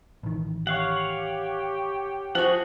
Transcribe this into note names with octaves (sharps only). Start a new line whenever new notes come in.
A1 D#3
G4 C#5 F5 F#5
F3 F#4 G#4 F#5